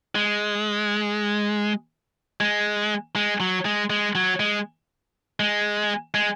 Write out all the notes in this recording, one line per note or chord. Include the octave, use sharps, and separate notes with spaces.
G#3
G#3
G#3
F#3
G#3
G#3
F#3
G#3
G#3
G#3